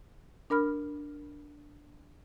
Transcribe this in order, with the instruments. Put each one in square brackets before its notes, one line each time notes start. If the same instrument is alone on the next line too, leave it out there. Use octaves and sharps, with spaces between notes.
[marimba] D4 A#4 B5 F6